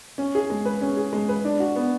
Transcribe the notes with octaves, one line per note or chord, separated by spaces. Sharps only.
C#4
G#4
G#3
B4
C#4
G#4
G#3
B4
D4
F#4
B3